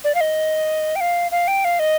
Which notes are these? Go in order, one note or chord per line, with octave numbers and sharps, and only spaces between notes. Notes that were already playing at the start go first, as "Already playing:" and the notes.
D5
F5
D#5
G5
F5
F5
G5
F5
D#5